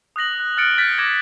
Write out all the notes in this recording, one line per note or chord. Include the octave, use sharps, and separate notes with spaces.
D#6 F#6 A#6 F#7
F#6
F6 F#6 A6 C#7 D7
F6 G6 A6 B6
D6 G#6 A#6